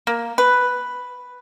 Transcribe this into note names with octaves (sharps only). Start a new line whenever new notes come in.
A#3
B4